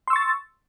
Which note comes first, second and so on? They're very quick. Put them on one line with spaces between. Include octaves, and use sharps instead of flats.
C6 E6 C#6 A6